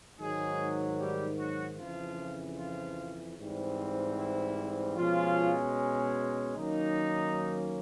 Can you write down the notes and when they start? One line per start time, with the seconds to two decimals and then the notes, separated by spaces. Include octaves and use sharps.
0.18 G#2 D#3 F#3 G#3 G#4
0.98 G3 G4
1.38 F#3 F#4
1.78 F2 C#3 E3 F3 F4
2.57 F3 F4
3.37 G#2 E3 G3 C4
4.18 E4
4.96 B2 F3 G#3 C#4 F4
6.56 D#3 F#3 A#3 C#4 D#4